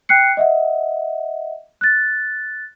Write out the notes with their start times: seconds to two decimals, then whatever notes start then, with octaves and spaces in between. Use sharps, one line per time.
0.09 G5 F#6 C7 C#7
0.37 D#5 E5 F#5
1.81 F#6 A6